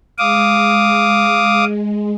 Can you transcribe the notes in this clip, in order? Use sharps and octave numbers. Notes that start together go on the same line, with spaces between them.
G#3 F5 D6 D#6